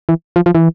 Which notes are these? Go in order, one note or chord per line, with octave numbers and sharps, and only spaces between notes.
E3
F3
F3
E3